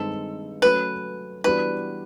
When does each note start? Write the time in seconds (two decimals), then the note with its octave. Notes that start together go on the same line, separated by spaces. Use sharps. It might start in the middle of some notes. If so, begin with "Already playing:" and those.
Already playing: G2 D#3 G#3 C4 D#4 A4
0.62 F#3 A3 C#4 B4
1.44 E3 G3 B3 D4 F#4 B4